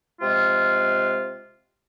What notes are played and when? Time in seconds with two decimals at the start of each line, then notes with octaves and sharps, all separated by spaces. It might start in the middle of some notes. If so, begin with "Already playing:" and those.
0.21 C3 G#3 F4